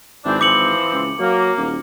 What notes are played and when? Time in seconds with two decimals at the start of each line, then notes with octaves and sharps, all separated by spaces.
0.25 G#1 E3 C4 D4
0.41 G#1 E3 F3 C4 D6 C#7 F#7
0.92 C#2
1.19 F#3 A#3
1.58 D#1